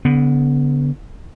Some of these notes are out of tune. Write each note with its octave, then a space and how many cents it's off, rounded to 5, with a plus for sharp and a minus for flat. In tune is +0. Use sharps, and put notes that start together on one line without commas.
D3 -35 B3 +0